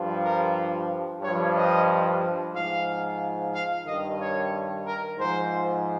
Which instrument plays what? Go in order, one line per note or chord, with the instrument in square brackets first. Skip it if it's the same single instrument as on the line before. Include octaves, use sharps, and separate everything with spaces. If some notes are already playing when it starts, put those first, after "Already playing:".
Already playing: [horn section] G2 F3
A#4
G2 F3 C#5
D#5
G#2 F3 F5
F5
G2 D#3 D#5
C#5
A#4
G#2 F3 C5